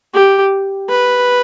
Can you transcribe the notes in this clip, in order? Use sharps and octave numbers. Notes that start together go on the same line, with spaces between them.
G4
B4